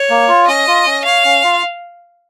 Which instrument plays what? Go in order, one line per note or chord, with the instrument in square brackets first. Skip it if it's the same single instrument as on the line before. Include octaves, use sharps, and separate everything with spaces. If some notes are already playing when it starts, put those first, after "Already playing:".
Already playing: [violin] C#5
[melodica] A#3
F4
[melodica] C#4 [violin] D#5
[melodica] F4
C#4
[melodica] C#5 [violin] F5
[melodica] C#4
F4